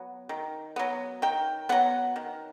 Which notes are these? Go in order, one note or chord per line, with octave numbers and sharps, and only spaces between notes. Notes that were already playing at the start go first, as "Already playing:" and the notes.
Already playing: F#3 B3
D#3
F#3 B3
D#3 G5
F#3 B3 F#5
D#3